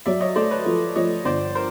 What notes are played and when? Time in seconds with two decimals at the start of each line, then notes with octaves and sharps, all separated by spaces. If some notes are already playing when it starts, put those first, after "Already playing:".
0.06 F#3 D5 E5
0.21 C#5 D#5
0.36 A3 C5 D5
0.51 B4 C#5
0.66 F3
0.96 F3 C#5 D#5
1.25 G1 C5 D5
1.55 A#4 C5